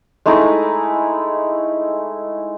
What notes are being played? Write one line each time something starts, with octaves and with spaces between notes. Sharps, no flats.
G#3 A3 D#4 E4